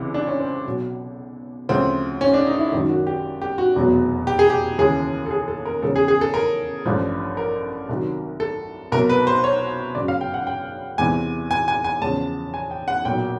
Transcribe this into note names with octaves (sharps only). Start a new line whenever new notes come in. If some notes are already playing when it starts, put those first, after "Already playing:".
Already playing: C#2 C3 E3
D4
C#4
C4
B1 B2 F#3
D2 C#3 F3 C4
C#4
D4
D#4
E4
G#1 F#2 D#3 F#3 D#4
F#4
G4
G4
F#4
F1 E2 B2 F#3
G4
G#4
G4
D#2 C#3 E3 G#4
A4
G#4
A4
A#4
E2 C#3 F3 A4
G#4
G#4
A4
A#4
A1 G2 D3 F3
A#4
C2 C3 D#3 F#3
A4
C2 B2 F#3 A#4
B4
C5
C#5
G1 F#2 C#3 F#3 D5
F5
G5
F#5
G5
E2 C3 E3 G#5
G#5
G#5
G#5
E2 C#3 F3 A5
G#5
G5
F#5
B1 A#2 F#3 G5